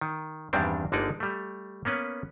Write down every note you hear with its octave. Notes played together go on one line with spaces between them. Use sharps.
D#3
E2 G2 D#3 G3 C4 D4
G1 D3 G#3 A#3 D#4 D5
G3 A3
A#3 B3 C#4 B4